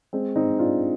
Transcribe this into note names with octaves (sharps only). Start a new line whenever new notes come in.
G#3 C4
C4 D#4
D4 F4